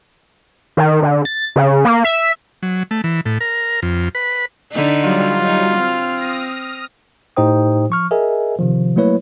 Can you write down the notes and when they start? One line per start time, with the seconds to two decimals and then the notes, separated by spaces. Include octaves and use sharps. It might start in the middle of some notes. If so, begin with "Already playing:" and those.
0.77 D#3
1.02 D3
1.25 A6
1.56 C#3
1.85 A#3
2.05 E5
2.63 F#3
2.91 A3
3.04 E3
3.26 A2
3.40 A#4
3.82 F2
4.15 B4
4.72 D3 D#4 B6
5.04 F#3 G3 F4
5.44 D#4
5.77 C4 F6
6.17 D#6 F6 A#6
7.37 A2 D#4 G4 C5 G5 D#6
7.90 F3 C#6 F6
8.11 G#4 A#4 D#5 E5 G#5
8.58 C3 D#3 F3
8.96 F#3 A3 A#3 E4 B4 C#5